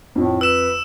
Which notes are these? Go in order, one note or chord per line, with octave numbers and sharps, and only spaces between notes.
F2 A2
B4 E6 E7